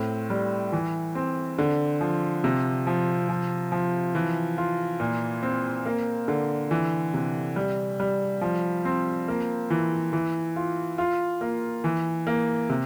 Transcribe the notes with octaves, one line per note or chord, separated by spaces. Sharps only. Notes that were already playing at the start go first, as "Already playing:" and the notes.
Already playing: A2 C4
G3
E3
C4
D3
F3
C3
F3
F3
F3
E3
F4
A#2
C4
A#3
D3
E3
C3
G3
G3
F3
C4
A#3
E3
E3
F4
F4
A#3
E3
A#3
C3